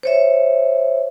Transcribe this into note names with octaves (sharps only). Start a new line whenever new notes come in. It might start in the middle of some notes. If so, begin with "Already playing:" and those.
C5 C#5 E5